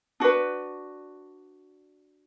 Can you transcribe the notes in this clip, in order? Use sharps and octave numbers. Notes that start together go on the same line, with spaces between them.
D4 F#4 B4